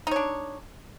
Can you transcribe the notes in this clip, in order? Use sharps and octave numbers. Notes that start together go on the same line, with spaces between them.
D4 D#4 C#5